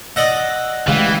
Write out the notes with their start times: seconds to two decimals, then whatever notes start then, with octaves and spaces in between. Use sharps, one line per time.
0.16 D5 D#5 F#5 E6 A#6
0.88 C#3 E3 G#3 A3 G4 F5